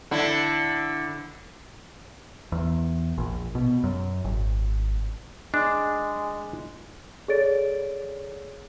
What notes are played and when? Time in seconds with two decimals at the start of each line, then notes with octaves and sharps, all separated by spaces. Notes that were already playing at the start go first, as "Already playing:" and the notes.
0.11 D3 E4
2.52 E2
3.18 A#1
3.55 B2
3.84 F#2
4.24 G#1
5.54 G#3 D4
7.28 G#4 A4 C#5 D5 A6 D7